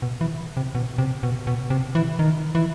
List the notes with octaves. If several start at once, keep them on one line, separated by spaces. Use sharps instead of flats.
B2
E3
C3
B2
C3
B2
B2
C3
E3
D#3
E3